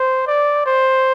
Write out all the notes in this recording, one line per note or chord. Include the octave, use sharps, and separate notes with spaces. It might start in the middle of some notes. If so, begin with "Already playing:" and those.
Already playing: C5
D5
C5